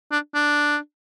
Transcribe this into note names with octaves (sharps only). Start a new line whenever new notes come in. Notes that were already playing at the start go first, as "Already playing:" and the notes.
D4
D4